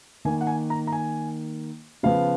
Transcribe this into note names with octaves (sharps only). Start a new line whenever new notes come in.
D#3 A#3 G#5
F#5
G#5
A#5
A#5
G#5
C#3 F3 B3 F5